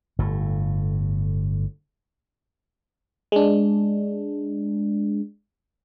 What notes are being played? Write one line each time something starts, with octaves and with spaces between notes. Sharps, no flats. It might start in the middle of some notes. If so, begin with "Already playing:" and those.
G1 A2
G#3 D4